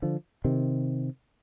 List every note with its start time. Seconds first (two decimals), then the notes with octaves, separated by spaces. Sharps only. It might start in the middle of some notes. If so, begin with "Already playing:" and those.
0.02 D3 F3
0.44 C3 D#3